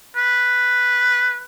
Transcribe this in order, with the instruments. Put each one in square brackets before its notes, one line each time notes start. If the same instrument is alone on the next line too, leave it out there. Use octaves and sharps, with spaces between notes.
[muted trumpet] B4